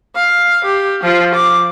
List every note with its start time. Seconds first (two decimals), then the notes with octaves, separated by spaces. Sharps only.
0.16 F5
0.64 G4
1.03 F3 F4
1.34 D6